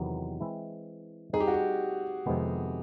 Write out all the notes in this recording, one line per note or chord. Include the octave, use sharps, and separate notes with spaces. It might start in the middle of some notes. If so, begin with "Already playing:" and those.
Already playing: E2 C3 D#3 F#3 B3
E3 G#3 C4 E4
G3 C4 D#4 G#4
G4
F#4
G4
F2 C3 D#3 G#3 B3